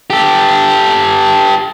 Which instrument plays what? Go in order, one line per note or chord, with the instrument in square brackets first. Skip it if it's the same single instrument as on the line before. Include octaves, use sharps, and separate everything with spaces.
[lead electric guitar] G4 A4